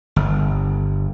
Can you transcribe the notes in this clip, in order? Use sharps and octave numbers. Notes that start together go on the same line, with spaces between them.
G1